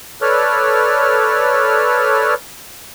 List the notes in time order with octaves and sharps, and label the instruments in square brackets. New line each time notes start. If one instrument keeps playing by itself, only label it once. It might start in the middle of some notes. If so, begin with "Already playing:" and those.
[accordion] A4 B4 C#5 D5 F6